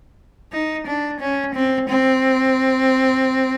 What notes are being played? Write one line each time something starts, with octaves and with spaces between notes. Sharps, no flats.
D#4
D4
C#4
C4
C4